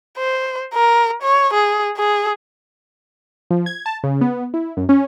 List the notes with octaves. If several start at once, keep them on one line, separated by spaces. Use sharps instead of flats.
C5
A#4
C#5
G#4
G#4
F3
G#6
A5
C#3
B3
E4
F#2
C#4